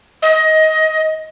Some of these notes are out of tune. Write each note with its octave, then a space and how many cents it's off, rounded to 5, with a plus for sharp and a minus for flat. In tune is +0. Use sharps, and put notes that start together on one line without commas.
D#5 +20